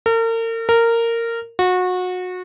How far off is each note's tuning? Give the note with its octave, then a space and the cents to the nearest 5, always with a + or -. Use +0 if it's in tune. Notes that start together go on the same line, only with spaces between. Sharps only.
A#4 -40
A#4 -15
F#4 -25